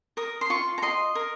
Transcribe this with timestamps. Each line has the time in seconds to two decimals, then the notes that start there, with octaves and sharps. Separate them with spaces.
0.17 A#4 D#6
0.41 C6
0.50 F4 C#6
0.78 A#5
0.82 D#5 C6
1.15 A#4